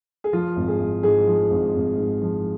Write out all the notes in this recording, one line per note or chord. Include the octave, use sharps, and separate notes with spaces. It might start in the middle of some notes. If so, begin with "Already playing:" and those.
G#4
F3 F4
G#1
G#4
G#1
G#2 G#4
F3
G#1
G#1
G#2
F3